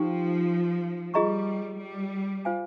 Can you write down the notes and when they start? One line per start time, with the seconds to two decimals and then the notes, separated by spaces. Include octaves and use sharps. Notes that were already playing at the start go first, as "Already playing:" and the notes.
Already playing: F3 D#4 G4 C5 G5
1.14 G3 F4 G#4 D#5 A#5 C#6
1.79 G3
2.45 F4 C5 F5 G#5